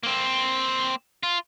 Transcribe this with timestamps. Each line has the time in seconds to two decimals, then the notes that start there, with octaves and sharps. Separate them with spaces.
0.03 A#3 C4
1.23 F4